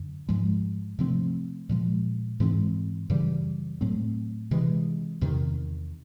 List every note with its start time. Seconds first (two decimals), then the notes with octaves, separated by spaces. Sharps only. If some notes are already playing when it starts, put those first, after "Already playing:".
Already playing: F#2 D3
0.29 G#2 F3 G#3
0.99 C3 F3 A3 C4
1.69 A#2 F3 G#3
2.40 G#2 E3 G#3 C4
3.10 F#2 C#3 E3 G3
3.81 A2 F#3 A3 C4
4.51 C3 E3 G#3
5.21 E2 C3 D#3